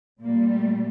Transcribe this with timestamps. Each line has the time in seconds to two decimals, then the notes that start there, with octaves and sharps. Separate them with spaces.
0.22 A#2 G3 A#3
0.52 A3